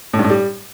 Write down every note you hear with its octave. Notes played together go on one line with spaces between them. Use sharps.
A2
G2
A2
G3